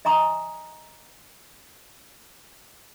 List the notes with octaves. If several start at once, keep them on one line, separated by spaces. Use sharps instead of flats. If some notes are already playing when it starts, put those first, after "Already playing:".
D#5 E5 G#5 A#5 C6 D#6